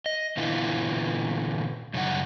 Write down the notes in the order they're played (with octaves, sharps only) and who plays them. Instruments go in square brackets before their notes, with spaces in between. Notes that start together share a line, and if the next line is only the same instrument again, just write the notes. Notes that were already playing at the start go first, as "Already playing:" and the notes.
[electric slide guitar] D#5
A#2 D3 E3 B3 E4 F4
F#2 C#3 G3 D#4 F#5